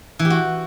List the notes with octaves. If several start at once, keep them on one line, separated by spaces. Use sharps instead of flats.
E3
G4
F#4